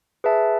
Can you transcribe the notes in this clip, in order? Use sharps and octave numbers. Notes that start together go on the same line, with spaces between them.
G#4 B4 E5 A5